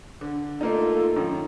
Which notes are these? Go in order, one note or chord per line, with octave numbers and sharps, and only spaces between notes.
D3
A3 A#3 D#4 F4 A4
F#2 D#3